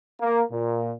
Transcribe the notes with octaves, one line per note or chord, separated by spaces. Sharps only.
A#3
A#2